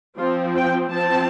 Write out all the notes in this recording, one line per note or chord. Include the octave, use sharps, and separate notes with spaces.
F3 C4 F4
G5
F3 C4 A5